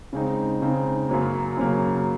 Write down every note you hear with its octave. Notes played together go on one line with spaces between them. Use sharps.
C#3 G#3 C4 D#4
C#3 G#3 C4 D#4
F#2 C#3 F#3 A#3
F#2 C#3 F#3 A#3